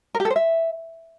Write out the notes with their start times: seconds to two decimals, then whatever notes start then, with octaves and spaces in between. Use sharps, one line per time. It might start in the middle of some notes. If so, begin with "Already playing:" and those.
0.15 A#4
0.20 G4
0.25 A4
0.30 C5
0.36 E5